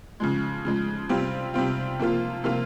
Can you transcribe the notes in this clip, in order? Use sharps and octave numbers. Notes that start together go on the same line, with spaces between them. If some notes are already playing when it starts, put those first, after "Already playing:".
C#3 F3 G#3
C#3 F3 G#3
C3 G3 C4 F4
C3 G3 C4 F4
C3 F3 A#3 F4
C3 F3 A#3 F4